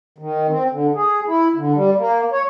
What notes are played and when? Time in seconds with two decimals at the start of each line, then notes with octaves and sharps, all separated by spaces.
0.18 D#3
0.49 C4
0.72 D3
0.95 G#4
1.27 E4
1.56 D3
1.74 G3
1.98 A#3
2.32 C#5